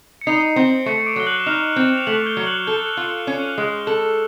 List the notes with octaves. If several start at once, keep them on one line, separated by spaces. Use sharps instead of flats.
C#7
D#4 C7
C4
A3 C#6 C#7
D6 D7
F#3 G7
F#6 F#7
E7
D#4 F6 F7
C4
F7
A3 F#6 F#7
G6 G7
F#3 G7
F#6 F#7
A4 G6 G7
F4
C#4
G#3
G7
A4 F#6 F#7